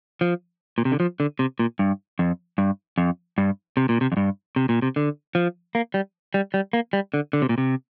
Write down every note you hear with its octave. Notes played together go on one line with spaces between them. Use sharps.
F3
A#2
C3
D3
F3
D3
C3
A#2
G2
F2
G2
F2
G2
C3
A#2
C3
F2
G2
C3
A#2
C3
D3
F3
A#3
G3
G3
G3
A#3
G3
D3
D3
C3
A#2
C3